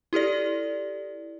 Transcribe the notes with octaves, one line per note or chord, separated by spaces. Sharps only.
E4 G4 A4 D5